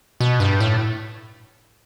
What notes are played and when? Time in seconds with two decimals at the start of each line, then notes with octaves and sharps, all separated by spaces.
0.20 B2
0.40 G2
0.60 A2